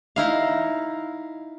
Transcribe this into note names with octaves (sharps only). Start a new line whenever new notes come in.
D#4 E4 F5